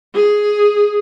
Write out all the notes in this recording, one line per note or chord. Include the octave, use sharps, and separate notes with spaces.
G#4